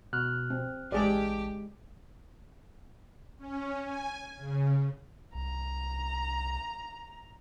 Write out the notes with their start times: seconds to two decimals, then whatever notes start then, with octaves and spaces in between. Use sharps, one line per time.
0.13 B2 F6 F#6
0.50 C4
0.92 A1 G#3 G4 G#4 D5 A5
3.38 C#4
3.84 G#5
4.36 C#3
5.35 C2 A#5